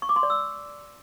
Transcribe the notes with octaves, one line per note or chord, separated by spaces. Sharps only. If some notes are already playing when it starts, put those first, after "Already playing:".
C#6
D6
C6
D5
E6